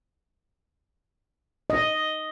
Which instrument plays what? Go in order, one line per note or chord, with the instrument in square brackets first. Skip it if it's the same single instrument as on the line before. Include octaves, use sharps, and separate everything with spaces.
[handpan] D#5